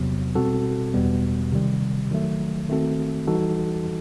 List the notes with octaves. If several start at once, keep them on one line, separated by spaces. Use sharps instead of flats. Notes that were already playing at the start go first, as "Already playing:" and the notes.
Already playing: E2 C3 F#3 B3
B2 G3 C4 F#4 A4
E2 B2 G3 B3
C3 D#3 G3
D#3 F#3 A3
D#3 A3 C4 F#4 A4
E3 G3 D#4 F#4 A4